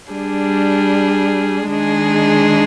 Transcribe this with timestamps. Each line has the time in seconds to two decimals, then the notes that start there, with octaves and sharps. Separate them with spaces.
0.11 G3 D4 G#4
1.68 D#3 G#3 D4 G#4